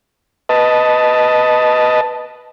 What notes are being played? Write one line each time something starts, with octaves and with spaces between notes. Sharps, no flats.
B4 D#5 A5